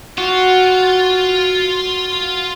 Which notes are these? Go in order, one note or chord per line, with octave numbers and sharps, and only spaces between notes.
F4 F#4